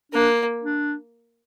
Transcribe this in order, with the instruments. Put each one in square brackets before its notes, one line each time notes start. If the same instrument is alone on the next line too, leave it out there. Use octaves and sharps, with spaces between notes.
[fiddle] A#3 [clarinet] D4
[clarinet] D4